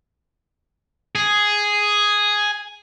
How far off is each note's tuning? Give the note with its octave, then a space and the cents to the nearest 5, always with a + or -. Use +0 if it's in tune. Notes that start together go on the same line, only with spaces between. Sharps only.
G#4 +0